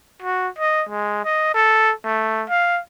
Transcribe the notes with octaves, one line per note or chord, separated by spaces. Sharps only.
F#4
D#5
G#3
D#5
A4
A3
F5